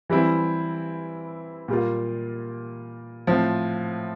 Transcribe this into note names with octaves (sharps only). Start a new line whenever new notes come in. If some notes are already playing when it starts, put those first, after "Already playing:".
E3 G3 C4 E4
A#2 G3 A#3 F4
A2 F3 C4